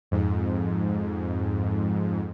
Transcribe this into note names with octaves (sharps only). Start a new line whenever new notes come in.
F2 G#2